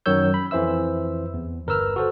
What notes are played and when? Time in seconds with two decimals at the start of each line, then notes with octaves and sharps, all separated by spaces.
0.06 F#2 D#3 F#3 C#5 E6 G6
0.34 B5
0.51 F2 E3 C5 E5 E6
1.34 E2
1.67 G1 A#4 B4 E6 F6
1.96 F#4 A4 C5